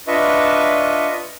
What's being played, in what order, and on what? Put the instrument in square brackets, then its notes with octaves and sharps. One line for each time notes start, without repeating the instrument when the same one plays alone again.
[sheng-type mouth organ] D4 F4 B4 D#5 E5 C#6